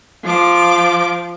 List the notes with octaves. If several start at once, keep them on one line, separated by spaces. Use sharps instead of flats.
F3 D6